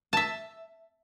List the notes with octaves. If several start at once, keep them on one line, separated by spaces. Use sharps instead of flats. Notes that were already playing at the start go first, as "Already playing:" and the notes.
E5 A5